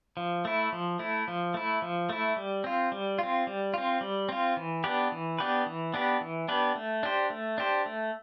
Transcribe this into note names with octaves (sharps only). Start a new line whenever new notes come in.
F3
A3 E4
F3
A3 E4
F3
A3 E4
F3
A3 E4
G3
C4 F4
G3
C4 F4
G3
C4 F4
G3
C4 F4
E3
B3 D4 G4 B4
E3
B3 D4 G4 B4
E3
B3 D4 G4 B4
E3
B3 D4 G4 B4
A3
D4 G4 C5
A3
D4 G4 C5
A3